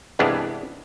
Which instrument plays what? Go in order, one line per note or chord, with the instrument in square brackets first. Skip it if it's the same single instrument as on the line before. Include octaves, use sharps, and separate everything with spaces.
[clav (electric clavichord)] C2 G2 E3 G#3 B3 D4